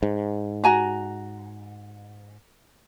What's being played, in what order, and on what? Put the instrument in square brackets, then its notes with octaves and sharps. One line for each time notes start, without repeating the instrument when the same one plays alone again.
[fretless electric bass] G#2
[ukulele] F#4 G#5 A#5